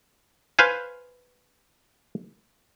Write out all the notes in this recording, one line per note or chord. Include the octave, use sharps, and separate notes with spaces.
B4 C5 F5 G#5